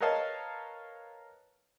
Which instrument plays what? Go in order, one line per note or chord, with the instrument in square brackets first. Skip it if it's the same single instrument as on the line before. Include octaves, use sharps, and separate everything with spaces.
[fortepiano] A#4 B4 C#5 D#5 F5 A5